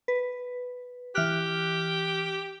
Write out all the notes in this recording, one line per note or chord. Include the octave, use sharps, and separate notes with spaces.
B4
E3 G4 F6 F#6